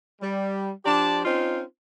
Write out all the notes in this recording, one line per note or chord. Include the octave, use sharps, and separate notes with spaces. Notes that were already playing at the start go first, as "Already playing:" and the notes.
G3
F3 D4 G4 D5 A5 C6
C4 C#4 D#4 F4 C5